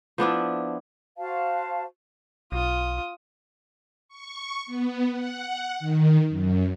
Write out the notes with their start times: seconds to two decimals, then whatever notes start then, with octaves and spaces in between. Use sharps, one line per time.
0.18 F3 B3 D4 E4
1.18 F#4 C5 F5 A5
2.52 B1 F4 D#6
4.08 C#6
4.66 B3
5.12 F#5
5.80 D#3
6.29 F#2